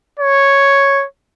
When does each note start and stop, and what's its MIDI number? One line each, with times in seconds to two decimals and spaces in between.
0.20 1.05 73